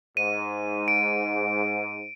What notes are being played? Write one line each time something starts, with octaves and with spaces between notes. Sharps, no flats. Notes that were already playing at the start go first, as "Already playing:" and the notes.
G#2 D#7
D7